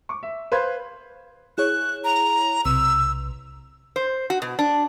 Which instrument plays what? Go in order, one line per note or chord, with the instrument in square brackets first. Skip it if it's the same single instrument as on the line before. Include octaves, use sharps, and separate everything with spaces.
[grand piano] C#6 D6
E5
B4 C5 F5 B5 C6 G#6
[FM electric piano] E4 G#4 C#5 [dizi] F#6
[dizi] A#5
[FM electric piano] B1 C3 [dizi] E6
[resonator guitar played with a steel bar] C5
F#4
B2
D4